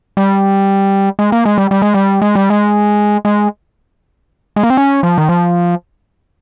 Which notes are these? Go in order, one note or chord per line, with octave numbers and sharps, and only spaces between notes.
G3
G#3
A#3
G#3
G3
G3
G#3
G3
G#3
G3
G#3
G#3
G#3
A#3
C4
C#4
F3
D#3
F3